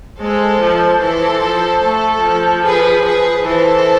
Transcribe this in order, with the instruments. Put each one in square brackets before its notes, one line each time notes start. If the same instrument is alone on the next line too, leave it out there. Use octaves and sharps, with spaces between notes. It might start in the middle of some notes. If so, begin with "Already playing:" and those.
[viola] G#3 [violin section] A4 C5
[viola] F3
[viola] E3 [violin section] A4 C5
[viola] F3
[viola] A3 [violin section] A4
[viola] F3
[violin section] G#4 B4
G#4 B4
[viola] E3 [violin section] A4 C5